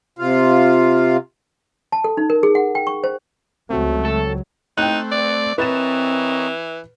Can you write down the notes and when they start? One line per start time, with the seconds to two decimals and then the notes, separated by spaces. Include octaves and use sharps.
0.19 C3 F4 F5
1.92 A5
2.04 A4
2.17 D#4
2.30 A#4
2.43 G#4
2.55 F#5
2.75 G5
2.87 C#6
3.04 C5
3.70 C#2 F#3 A3 C4 F#4
4.05 A4
4.78 A3 C4 D#4 G5 F#6
5.12 D5
5.58 E3 C4 A#4 B4 C#5 D#5 A6 E7